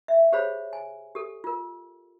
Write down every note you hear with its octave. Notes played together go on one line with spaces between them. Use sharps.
E5
G4 G#4 C5 C#5 F5 B5
G#5
G4 A4
F4 A#4